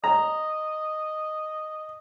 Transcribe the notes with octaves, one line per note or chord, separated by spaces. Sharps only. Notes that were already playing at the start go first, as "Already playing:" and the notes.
D#5 A#5